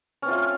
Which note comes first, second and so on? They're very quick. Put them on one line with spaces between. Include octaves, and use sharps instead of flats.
C#4 C4 F4 A3